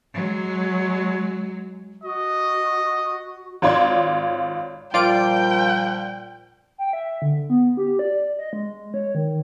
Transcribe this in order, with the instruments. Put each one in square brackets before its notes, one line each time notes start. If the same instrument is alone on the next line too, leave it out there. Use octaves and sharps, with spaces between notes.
[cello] F#3 G#3
[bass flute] F#4 [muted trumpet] D#5
[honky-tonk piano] G#1 F4 C#5 D5 C6 G#6
[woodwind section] A#2 F3 G3 [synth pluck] F4 D5 D7 [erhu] G5
[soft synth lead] G5
E5
D3
B3
G4
D5
D#5
G#3
C#5
D#3